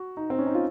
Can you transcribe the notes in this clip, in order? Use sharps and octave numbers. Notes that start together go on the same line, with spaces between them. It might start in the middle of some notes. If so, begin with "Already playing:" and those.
Already playing: F#4
D#4
C4
C#4
D#4
F4